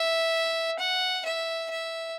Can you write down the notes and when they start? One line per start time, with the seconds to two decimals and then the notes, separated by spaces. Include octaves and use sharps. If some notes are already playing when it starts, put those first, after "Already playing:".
Already playing: E5
0.79 F#5
1.25 E5
1.70 E5